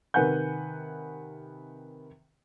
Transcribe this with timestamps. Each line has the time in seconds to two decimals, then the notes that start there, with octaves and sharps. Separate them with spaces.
0.14 C3 D#3 B4 F#5 G#5 G6